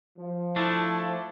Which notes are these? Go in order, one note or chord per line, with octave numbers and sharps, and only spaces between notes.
F3
A3 D4 E4